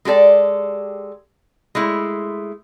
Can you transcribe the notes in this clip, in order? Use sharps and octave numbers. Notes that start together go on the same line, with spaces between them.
G#3 G4 A4 D5
G#3 A3 E4